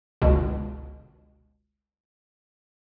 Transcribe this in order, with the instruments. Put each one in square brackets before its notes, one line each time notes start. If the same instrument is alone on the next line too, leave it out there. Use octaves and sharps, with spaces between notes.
[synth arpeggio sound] G1 C#2 B2